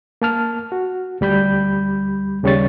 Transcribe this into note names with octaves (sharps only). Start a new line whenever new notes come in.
A#3 A5 F6
F#4
D2 G3 B5 G6
D#2 C#3 G3 C#5 C#6 A6